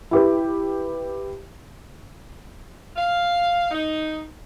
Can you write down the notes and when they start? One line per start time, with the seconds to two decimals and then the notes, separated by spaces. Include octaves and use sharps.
0.11 E4 G4 B4
2.96 F5
3.71 D#4